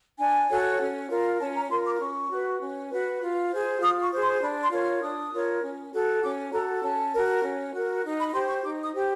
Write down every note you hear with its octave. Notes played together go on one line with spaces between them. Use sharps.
D4 G#5
F#4 A4 C#5
C#4
F4 A#4
C#4 A5
A#5
F4 A#4 C6
D6
C#4 C#6
F#4 B4
C#4
F#4 B4
F4
G#4 C5
F4 D#6
C#6
G#4 C5
C6
D4 B5
C6
F4 A#4 C#5
F6
D4 D#6
F4 A#4 C#5
C#4
F#4 A4
C#4 D6
F#4 A4 A#5
C#4 A5
F#4 A#4
C#4
F#4 A#4
D#4
B5
G4 C5 C6
C#6
D#4 D6
D#6
G4 C5